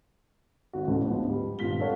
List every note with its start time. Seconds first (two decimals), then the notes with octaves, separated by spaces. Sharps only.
0.73 G#1 F#4
0.88 A1 D2 A2 C#3
1.05 G#2 F3 B3 D4
1.30 G3
1.59 G#1 G2 A#2 F4 B6 G7
1.79 F4 A4 A#4 C#5 F5 F#5